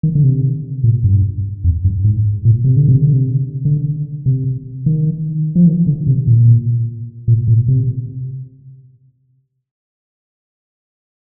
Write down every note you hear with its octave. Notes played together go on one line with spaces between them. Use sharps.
D#3
D3
C3
A#2
G2
F2
G2
G#2
A#2
C3
D3
C3
D3
C3
D3
C3
D#3
F3
D#3
D3
C3
A#2
A#2
A#2
C3